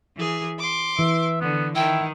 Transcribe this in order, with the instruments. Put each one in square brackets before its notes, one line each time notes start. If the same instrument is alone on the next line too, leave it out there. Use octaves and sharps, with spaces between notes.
[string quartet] E3 G#4
C6 D6
[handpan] E3 [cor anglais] E5
[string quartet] D3 [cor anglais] B3
[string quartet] D#3 [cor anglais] E4 [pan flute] G5